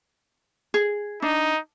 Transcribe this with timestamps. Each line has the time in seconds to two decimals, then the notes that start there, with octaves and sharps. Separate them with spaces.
0.74 G#4
1.22 D4 D#4